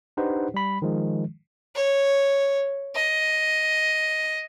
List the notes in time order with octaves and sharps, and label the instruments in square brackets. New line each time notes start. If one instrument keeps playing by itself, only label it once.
[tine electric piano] D4 D#4 G4 B4 C5 F#5
G3 B5
D#3 F3 G#3
[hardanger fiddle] C#5
D#5